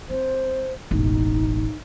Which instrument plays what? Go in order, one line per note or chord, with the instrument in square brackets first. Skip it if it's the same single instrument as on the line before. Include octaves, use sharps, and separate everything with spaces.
[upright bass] C4 [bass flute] C5
[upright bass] E1 A1 [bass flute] D#4